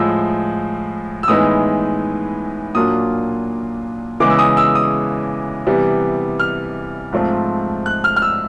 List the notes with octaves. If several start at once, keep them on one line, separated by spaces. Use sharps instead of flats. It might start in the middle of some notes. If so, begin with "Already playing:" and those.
Already playing: A2 F3 G#3 E6
E6
A2 E3 G#3 B3 D#4 D#6
A#2 F#3 A#3 D4 F4 D#6
C#3 E3 G#3 B3 D6
E6
D#6
E6
D#6
C3 E3 G3 B3
F6
G#2 F3 A3 C4 F4
F#6
F6
F6
E6